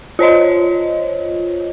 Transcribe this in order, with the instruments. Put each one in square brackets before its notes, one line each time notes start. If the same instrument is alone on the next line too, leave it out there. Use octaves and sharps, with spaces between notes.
[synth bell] F4 C5 C#5 D#5